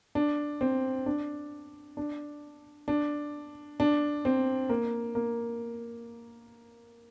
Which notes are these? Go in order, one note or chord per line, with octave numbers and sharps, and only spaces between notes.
D4
C4
D4
D4
D4
D4
C4
A#3
A#3